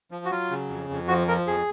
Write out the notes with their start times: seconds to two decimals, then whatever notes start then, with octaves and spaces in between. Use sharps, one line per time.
0.11 F3
0.25 F#4
0.31 F#3 F4
0.50 C#3
0.69 F2
0.90 F2
1.08 F3 F#4
1.27 F3 A#4
1.47 F2 G#4